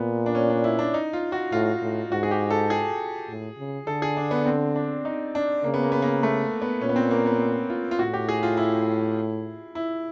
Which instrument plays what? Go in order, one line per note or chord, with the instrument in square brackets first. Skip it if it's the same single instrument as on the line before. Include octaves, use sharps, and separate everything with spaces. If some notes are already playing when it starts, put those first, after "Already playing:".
Already playing: [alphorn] A#2 [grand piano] B3
[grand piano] D4
C#4
D4
E4
D4
D#4
F4
F#4
[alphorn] A2 [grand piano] F4
[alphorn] A2
[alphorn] G#2 [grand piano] F#4
[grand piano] G#4
G4
A4
G#4
[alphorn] A2
C#3
[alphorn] D3 [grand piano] A4
[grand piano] G#4
D4
B3
C4
D4
D#4
D4
[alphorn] C#3 [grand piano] A#3
[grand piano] B3
A#3
B3
A#3
A3
B3
[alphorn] A#2 [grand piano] C#4
[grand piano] B3
C4
A#3
B3
F4
F4
[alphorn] A2 [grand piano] F#4
[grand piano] G4
G#4
F4
E4
E4